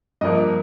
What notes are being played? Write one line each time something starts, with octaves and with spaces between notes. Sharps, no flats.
G2 F3 A#3 D#5